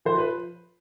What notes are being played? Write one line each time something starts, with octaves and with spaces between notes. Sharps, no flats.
F3 C5
B4